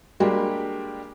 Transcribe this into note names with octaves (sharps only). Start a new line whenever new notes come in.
G3 G#3 A#3 D4 F#4 G4